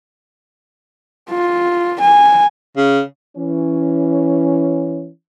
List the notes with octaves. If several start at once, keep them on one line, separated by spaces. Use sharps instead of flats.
F4
G#5
C#3
E3 C#4